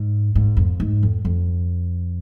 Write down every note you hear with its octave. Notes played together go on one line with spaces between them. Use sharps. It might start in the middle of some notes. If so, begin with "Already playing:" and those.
Already playing: G#2
G#2
F2
G#2
F2
F2